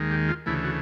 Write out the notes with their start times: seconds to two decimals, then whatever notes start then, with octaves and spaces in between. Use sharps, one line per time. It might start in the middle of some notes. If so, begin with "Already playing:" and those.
Already playing: D#2 D#3 G#3
0.11 G4
0.29 F4
0.46 D2 C#3 E3 A3 E4
0.65 F#4